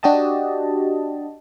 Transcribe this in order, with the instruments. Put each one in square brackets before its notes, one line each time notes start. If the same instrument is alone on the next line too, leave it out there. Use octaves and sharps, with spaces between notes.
[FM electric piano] D4 F#4 G4 D#5 A5